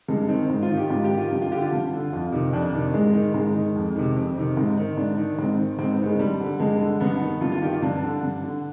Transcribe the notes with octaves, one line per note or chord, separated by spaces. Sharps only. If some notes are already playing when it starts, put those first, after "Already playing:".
G2 G#3
D#3 C4
G#2
F4
D#3
G4
G#2 F4
G4
D#3
F4
G2 G4
F4
D3 G4
F4
G2
D3
F2 F4
C3 D#3
F2 D4
C3 D#3
G#2 G#3
D#3
G#2 G#3
D#3
F2
C3 D#3
F2 C4
C3 D#3
G#2
D#3
G#2 D4
D#3
G#2 C4
D#3
G#2 C4
B3
D#3
G#3
G2 G3
D3
G2 G#3
D3
G2 B3
D#3
G2 F4
F4
D#3 G4
F4
G2 D4
D3
G2
D3